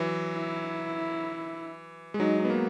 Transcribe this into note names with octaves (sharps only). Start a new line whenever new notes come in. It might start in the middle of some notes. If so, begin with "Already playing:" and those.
Already playing: E3 F#3
E4
G#3
F#3 D#4
B3
A#3